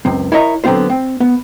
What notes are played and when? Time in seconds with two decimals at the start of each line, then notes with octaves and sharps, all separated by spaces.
0.05 C#2 F#2 C4
0.32 E4 A#4 C#5 D#5 E5 A#5
0.64 D3 F#3 B3 C4 F4 C5
0.89 C4
1.20 B3